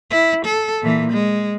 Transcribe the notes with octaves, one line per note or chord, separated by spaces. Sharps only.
E4
A4
A#2 E3
G#3